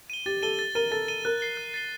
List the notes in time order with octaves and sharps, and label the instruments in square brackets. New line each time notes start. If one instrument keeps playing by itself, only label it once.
[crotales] D#7 G7
[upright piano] G4 [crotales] A6
[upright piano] A4 [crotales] D#7 G7
[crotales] A6
[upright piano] A#4 [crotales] D#7 G7
[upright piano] A4 [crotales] A6
[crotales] D#7 G7
[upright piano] A#4 [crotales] F#6
[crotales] A6 C7 G7
F#6
A6 C7 G7